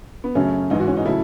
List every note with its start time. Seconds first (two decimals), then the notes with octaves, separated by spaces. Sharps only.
0.24 B3
0.35 F#2 C#3 F#3 A3 C#4
0.70 A1 G#2 E3 D#4
0.79 F#4
0.87 C#4
0.97 D#4
1.05 C#3 F#3 A3 E4